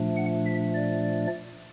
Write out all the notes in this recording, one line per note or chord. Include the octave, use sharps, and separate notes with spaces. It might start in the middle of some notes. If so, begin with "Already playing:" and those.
Already playing: A#2 F3 A3 D4
F#5
E5
D5